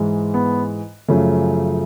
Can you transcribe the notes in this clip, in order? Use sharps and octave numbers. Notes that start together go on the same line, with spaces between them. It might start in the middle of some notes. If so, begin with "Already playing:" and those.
Already playing: G#2 E3 G#3
B3
F#2 C#3 F3 A3